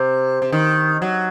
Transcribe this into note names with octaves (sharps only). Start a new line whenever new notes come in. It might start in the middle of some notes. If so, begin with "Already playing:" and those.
Already playing: C3
C3
D#3
F#3